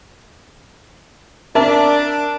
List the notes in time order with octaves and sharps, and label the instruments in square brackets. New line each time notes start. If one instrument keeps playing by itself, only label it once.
[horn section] D4 [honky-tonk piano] A#4 E5 A5